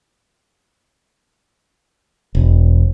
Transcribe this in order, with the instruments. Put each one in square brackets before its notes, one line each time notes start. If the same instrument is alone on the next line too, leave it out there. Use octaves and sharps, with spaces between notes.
[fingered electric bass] E1